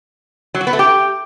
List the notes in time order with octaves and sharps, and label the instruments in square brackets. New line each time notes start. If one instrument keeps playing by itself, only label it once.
[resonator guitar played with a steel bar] F#3
F#4
B3
A3
G4